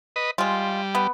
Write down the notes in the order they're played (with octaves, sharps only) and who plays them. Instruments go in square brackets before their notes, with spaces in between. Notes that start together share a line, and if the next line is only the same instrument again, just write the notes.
[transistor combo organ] B4 D#5
[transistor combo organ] G3 [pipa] G#3 F4
[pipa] B3